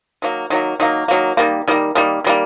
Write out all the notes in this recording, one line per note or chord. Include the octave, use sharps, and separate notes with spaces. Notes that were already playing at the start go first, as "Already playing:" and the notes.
D#3 F#3 A#3
D#3 F#3 A#3
D#3 F#3 A#3
D#3 F#3 A#3
D#3 G3 A#3
D#3 G3 A#3
D#3 G3 A#3
D#3 G3 A#3